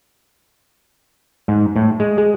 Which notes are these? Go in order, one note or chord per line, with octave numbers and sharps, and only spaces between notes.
G#2
A2
G#3
G#3